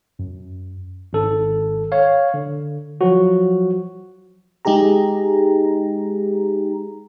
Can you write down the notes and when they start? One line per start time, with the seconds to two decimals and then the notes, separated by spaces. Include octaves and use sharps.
0.19 F#2
1.13 G#1 A4
1.92 C#5 F5
2.34 D3
3.01 F3 F#3 F#4
4.65 G#3 D#4 G4 G#4 A#5